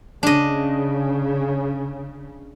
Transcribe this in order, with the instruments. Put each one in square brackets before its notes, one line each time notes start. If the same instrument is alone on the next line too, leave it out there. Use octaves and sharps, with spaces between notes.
[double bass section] C#3 [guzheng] D4 D#5